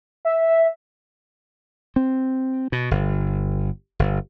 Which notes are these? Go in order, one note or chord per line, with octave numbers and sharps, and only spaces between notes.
E5
C4
B2
G1
G1